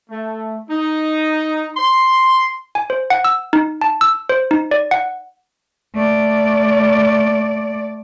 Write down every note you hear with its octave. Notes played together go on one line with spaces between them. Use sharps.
A3
D#4
C6
G#5
C5
F#5
E6
D#4
A5
E6
C5
D#4
D5
F#5
A3 D5